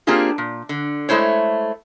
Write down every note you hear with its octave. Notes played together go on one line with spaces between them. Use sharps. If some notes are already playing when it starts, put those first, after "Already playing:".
A#3 C4 D4 F4 G4 G#4
A#2
D3
G#3 A3 E4 C5 C#5